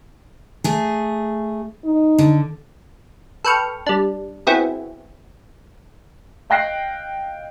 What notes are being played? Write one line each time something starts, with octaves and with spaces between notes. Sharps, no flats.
A3 G#4
D#4
D3
A4 B4 G5 C#6 F6
G3 D4
B3 C4 E4 F#4 G#4
D#5 F5 G5 F#6 A#6 C7